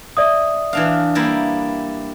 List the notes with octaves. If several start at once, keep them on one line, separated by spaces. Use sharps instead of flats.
D5 E5 D#6
E3 D4 F5
G3 A#3 E4